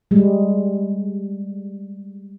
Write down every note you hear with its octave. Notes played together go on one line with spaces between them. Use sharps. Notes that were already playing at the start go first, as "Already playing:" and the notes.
G3 G#3